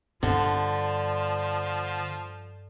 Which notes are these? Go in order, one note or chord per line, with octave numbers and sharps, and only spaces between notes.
G2 D3 F3